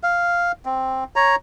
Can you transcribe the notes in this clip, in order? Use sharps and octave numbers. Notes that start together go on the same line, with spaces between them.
F5
C4
C#5 A#5